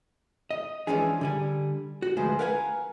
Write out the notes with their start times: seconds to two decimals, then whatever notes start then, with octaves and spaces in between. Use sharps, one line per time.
0.51 D#5
0.87 E3 F3 G#3 C#4 D4 G#4
1.21 D3 G3 G#5
2.02 F#4
2.17 D2 F3 G#3 A3 B4 C5
2.39 A#4 B4 F5 F#5 G#5